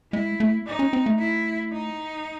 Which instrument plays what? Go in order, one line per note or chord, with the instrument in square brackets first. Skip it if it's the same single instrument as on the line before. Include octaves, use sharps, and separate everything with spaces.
[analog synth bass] G#3 [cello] E4
[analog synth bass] A3
[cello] D#4
[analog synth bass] C#4
C4
A3
[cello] E4
D#4